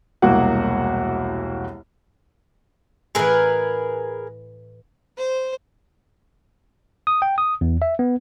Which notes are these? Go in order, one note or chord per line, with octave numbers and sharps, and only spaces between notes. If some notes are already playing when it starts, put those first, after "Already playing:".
E1 C2 A#3 F#4 F#5
A2 E3 G#4 A#4 B4
C5
D#6
G5
D#6
E2
E5
B3